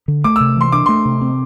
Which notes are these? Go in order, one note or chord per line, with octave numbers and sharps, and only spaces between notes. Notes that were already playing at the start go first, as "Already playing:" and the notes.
D3
A3 D6
C3 E6
E3 C6
D4 D6
A3 C6
C3
C4